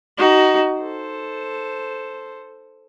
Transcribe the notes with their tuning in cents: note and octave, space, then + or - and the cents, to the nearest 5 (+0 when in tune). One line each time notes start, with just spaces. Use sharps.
D#4 +0 F#4 +25
A4 +0 C5 +0